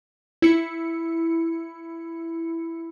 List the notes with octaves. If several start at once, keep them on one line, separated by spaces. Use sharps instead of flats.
E4 C#7